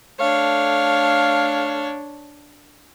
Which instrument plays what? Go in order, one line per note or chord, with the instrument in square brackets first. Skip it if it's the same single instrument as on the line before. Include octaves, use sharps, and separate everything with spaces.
[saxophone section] A3 F5 [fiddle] D4 C#5